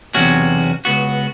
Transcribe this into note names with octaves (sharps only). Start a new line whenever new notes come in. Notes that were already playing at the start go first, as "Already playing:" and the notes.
B1 E2 C3 C#4 F#4
C#2 B3 F#4